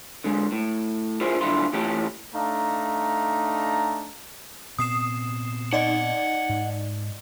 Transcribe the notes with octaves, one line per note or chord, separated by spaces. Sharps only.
D3 G#3
A2
E4 F4 G#4 A#4 C5
B1 G2 D3 E4 F4 C6
E3 A3 C#4 F4 G4 A4
A3 D4 D#4 F5 A#5
A#2 B3 C4 D#6 C7 E7
D#4 D5 D#5 F#5
G#2